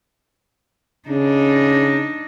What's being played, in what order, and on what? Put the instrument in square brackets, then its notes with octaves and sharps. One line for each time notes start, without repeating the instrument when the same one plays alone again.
[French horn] C#3 [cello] D4 D#4